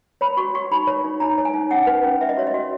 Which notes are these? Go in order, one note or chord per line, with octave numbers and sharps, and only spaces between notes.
C#5 B5
F#4 C#6
F#4 C#6
D#4 B5
C#5
D#4
D#4 A#5
C#5
G#5
D#4
C#4 F#5
B4
C#4
B4 E5
D#5
F#4 C#5
D#5
F#4